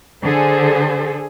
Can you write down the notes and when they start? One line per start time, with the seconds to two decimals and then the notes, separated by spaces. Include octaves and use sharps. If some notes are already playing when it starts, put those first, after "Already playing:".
0.21 D3 G#4 A4 C5